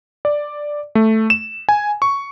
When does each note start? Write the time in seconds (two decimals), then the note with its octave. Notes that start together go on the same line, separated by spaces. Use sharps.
0.25 D5
0.95 A3
1.30 E7
1.69 G#5
2.02 C#6